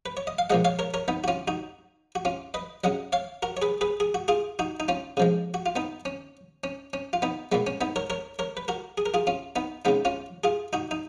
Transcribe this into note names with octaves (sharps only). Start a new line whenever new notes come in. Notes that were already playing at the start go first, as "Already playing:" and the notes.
B4
C#5
D#5
F5
A#2 F3 G#3 D#5 F#5
C#5 F5
A#4 C#5
A#4 C#5
B3 D#4
F#4
C#4 F4
D#4 F#4
F#4
C#4 F4
B4 D#5
C#3 F#3 D#5 F#5
C#5 F5
F#4 A#4
C#5
G#4 B4
G#4 B4
G#4
F#4
F4 G#4
D#4 F#4
D#4
C#4 F4
C#3 F3 G#3
F#4
F4
B3 D#4
C#4
C#4
C#4
F4
B3 D#4
A#2 G#3 B3
C#4
B3 D#4
A#4 C#5
A#4 C#5
A#4 C#5
B4
F#4 A#4
G#4
A#4
F4 G#4
C#4 F4
B3 D#4
C#3 G#3 B3 D#4
C#4 F4
F4 G#4
D#4 F#4
D#4